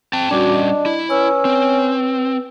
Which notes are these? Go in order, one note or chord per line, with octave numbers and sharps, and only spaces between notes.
C4 G5 A5
G3 C#4 D4 F#4 D6
D#5
E4
C#4 B4 E6
C4